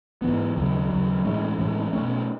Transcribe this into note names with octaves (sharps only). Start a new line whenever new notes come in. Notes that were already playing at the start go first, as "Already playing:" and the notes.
G#2 E3 B3
D#2 C#3 F#3
D#2 C#3 F#3
A2 E3 G#3 C#4
A2 E3 G#3 C#4
B2 A3 C#4